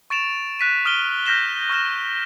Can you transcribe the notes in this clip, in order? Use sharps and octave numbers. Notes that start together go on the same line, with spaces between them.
C#6 A6 D7 E7 F7
F#6 B6 D#7
D#6 F6 D7 D#7 G7
F6 G6 A#6 B6 E7 G7
C#6 F6 A#6 E7